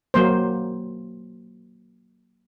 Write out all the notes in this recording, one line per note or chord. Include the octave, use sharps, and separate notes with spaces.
F#3 A#3 C5